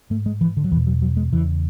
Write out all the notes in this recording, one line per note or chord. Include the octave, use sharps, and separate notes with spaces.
G#2 A3
G#3
E3
D3
F#3
E2 B2 E3
F#3
F#3
G#3
E2 C#3 E3